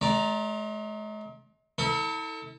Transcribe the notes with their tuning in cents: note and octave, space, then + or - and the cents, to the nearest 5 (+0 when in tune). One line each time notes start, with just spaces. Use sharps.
G#3 +45 D5 +0 A#5 +0
E4 -40 A4 +25